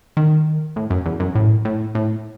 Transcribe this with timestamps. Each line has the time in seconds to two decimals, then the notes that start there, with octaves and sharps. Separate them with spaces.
0.17 D#3
0.76 A2
0.90 F#2
1.06 E2
1.20 F#2
1.35 A2
1.65 A2
1.95 A2